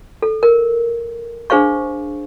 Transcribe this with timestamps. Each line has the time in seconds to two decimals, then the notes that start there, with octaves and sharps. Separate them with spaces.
0.22 A4
0.43 A#4
1.50 D4 G#4 C5 F5 C#6